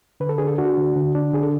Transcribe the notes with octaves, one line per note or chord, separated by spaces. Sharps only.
D3 B4
A4
D4 G#4
A4
D4 F#4
D3
D3
D4
D3 G#4
A4